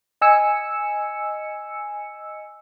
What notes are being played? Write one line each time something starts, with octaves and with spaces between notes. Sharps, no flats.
D#5 G#5 E6 C#7